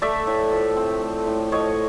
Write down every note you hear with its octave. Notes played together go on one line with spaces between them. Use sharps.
A3 D5 E5
A2
F3
C4
A3
A2
F3 C#5 D#5